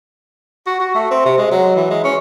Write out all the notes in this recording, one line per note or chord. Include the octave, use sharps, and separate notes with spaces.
F#4
F#4
A3
C4
C3
G#3
F#3
E3
G#3
C#4